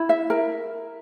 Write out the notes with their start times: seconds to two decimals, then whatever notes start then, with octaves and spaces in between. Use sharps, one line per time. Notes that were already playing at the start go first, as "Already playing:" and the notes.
Already playing: E4
0.09 E5
0.30 A#4